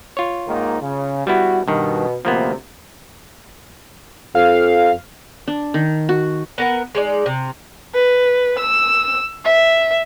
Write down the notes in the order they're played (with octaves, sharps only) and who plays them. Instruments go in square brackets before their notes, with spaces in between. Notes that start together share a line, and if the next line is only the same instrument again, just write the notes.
[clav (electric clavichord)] F4 C#5
[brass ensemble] G#2 D#3 A#3
C#3
[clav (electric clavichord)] G3 B3 E4 [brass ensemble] F#4
[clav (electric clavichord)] G2 D#3 [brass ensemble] B2
[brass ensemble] D2 C3 [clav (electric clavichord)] F3 A#3 B3
[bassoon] F2 [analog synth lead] F5
[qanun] D4
D#3
F#4
[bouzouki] B3 A#4 F#5
G#3 D#4 D5
C3
[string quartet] B4
E6
E5